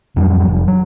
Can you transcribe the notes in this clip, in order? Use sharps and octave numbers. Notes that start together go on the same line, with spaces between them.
F2 F#3 G3
F1
F#3